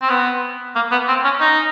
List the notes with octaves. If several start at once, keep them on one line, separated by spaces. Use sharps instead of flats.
C4
B3
A#3
B3
C4
C#4
D#4